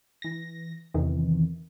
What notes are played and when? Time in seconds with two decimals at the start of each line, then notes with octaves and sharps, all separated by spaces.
0.22 E3 A#6
0.94 E2 C3 D#3 E3